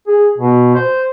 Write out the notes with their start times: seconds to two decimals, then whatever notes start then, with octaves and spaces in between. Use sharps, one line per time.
0.07 G#4
0.38 B2
0.75 C5